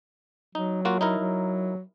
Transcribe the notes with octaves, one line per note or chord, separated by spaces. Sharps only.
F#3 D#4
A#3 F4 F#4
D#4 E4 A#4
F#3